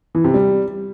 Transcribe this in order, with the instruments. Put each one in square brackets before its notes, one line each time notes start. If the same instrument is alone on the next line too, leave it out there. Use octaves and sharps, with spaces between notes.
[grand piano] E3
C3
G3